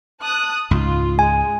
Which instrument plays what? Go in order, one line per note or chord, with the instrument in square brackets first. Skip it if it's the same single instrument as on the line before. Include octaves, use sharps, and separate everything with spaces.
[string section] A5 D#6 F#6
[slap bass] C#2 G#2 [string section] F4
[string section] G#3 [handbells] G#5